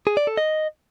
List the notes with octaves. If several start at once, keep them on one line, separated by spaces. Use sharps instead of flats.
G#4
D5
A4
D#5